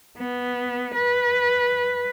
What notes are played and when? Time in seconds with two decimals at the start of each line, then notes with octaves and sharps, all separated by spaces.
0.18 B3
0.95 B4